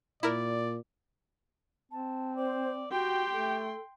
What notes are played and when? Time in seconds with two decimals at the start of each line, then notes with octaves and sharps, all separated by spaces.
0.23 A#2 E4 A#4 D5
1.91 C4 A5
2.37 C5 D5
2.91 F#4 G4 G5 C6
3.33 A3 A4